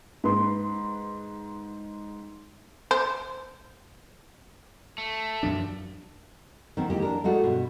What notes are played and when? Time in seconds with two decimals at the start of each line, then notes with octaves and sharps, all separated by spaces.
0.24 G#2 B4 C6
2.91 C5
4.98 A3
5.43 F#2 F3 D4
6.77 D#3 B3 C4
6.90 E3 G#3 A#3 G4
7.02 D4 A#4
7.24 G#3 A3 F4 F#4
7.43 G2 B2